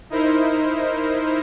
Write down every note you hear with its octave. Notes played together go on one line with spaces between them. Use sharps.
D#4 E4 A#4 C5